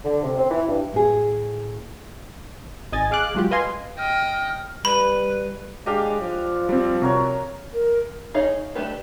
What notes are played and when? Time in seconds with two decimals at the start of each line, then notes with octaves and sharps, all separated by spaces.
0.04 D3
0.22 C3
0.38 C4
0.50 E3
0.67 G2
0.93 A2 G#4
2.92 G#1 D#5 G#5 A6
3.11 G#4 F5 D6 F#6
3.35 F#3 G#3 F4 G4
3.51 B4 D#5 F5 G#5 C6
3.98 D#5 G5 F6
4.85 G3 B4 B5
5.86 G#3 D4 G4 D#5 F5
6.21 F3
6.69 G3 C4
7.02 C3 F#4 A#4 C#5
7.74 A#4
8.34 D#4 G#4 C#5 D#5 F5
8.75 A3 D4 G4 B4